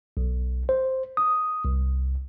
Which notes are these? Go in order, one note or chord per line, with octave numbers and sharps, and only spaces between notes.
B1
C5
D#6
C2